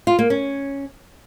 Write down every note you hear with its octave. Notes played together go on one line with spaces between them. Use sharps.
F4
A#3
C#4